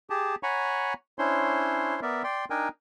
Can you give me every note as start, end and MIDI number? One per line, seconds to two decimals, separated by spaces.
0.10 0.35 67
0.10 0.35 68
0.10 0.35 81
0.43 0.94 73
0.43 0.94 78
0.43 0.94 80
0.43 0.94 82
0.43 0.94 83
0.43 0.94 85
1.19 2.00 61
1.19 2.00 62
1.19 2.00 64
1.19 2.00 72
1.19 2.00 73
1.19 2.00 84
2.02 2.23 59
2.02 2.23 70
2.02 2.23 74
2.02 2.23 76
2.24 2.45 74
2.24 2.45 79
2.24 2.45 84
2.50 2.69 62
2.50 2.69 63
2.50 2.69 70
2.50 2.69 79
2.50 2.69 80